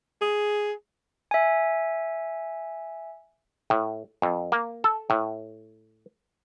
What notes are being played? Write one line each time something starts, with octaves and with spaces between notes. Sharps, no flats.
G#4
E5 G#5
A2
F2
A#3
A4
A2